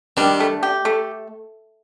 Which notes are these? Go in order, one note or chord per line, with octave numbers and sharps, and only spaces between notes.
D#3 G3 D4
A3
G4
A3